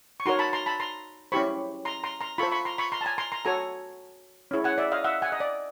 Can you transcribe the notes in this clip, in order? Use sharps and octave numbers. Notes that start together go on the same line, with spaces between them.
C#6
D#4 F#4 A#4 C#5 A#5 C6
A5 B5
A#5 C6
A5 B5
A#5 C6
C#4 E4 G4 C5 B5 C#6
A#5 C6
A#5 C6
A#5 C6
F4 A4 C5 B5 C#6
B5 C#6
A#5 C6
B5 C#6
A#5 C6
A5
G#5 A#5
A#5 C6
A#5 C6
F#4 A4 C#5 G#5 A#5
C#4 E4 G#4 C#5
F#5 G#5
D5 E5
D#5 F5
E5 F#5
F#5 G#5
D#5
D5